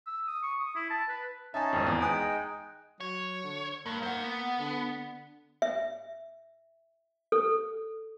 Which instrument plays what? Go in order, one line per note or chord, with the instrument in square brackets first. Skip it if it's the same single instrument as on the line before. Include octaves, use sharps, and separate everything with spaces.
[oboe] E6
D#6
C#6
D#6
E4
A5
B4
[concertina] C#4 D#4 A5 [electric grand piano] E5 G#5
[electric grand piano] G#1 F2
E2
[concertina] G#3 D#4 G5 [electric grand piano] G#5 D#6 F#6
[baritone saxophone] F#3 [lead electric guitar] C#5
[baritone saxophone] D3
[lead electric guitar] G2 [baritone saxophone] A#3
[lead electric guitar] C5 F#5
B3
[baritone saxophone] D3
[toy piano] E5
A4